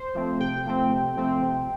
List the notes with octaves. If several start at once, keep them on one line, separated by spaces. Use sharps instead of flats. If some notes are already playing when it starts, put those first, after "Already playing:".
Already playing: C5
F3 A3 C4
C3 G5
F3 A3 C4
C3
F3 A3 C4
C3